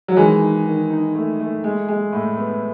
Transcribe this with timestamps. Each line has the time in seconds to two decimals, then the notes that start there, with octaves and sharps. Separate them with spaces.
0.08 F#3
0.17 D#3 E3 G#3
0.41 D#4
0.66 D#3
0.90 D#4
1.15 A3
1.40 A3
1.64 G#3
1.88 G#3
2.13 A2
2.37 B3